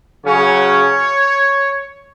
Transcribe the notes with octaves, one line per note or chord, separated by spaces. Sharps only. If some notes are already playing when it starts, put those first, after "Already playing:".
C#3 F#3 C#4 C#5